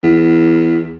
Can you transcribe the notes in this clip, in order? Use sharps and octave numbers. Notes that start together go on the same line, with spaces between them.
E2